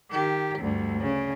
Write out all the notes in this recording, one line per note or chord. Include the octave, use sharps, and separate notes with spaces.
D#3 G4
D2 G2
C#3